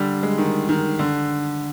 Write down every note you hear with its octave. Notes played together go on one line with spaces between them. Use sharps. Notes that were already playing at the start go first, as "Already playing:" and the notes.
Already playing: D3 G3
G#3
D#3
D#3
D3